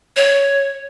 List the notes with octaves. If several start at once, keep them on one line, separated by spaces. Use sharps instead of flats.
C#5